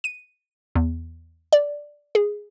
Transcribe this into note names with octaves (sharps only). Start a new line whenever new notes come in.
D#7
E2
D5
G#4